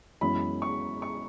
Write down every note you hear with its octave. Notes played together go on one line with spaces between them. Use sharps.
F#2 E3 G#3 B3 B5
C#6
C#6